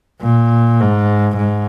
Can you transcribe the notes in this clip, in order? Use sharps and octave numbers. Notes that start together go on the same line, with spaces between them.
A#2
G#2
G#2